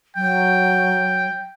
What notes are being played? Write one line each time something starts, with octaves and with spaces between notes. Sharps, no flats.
F#3 G5